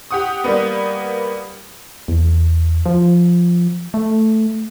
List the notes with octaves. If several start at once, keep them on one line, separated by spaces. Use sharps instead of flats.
G4 F#5 D#6
G3 A#3 B3
E2
F3
A3